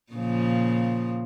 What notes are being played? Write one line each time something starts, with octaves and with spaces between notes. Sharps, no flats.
A#2 C#3 F3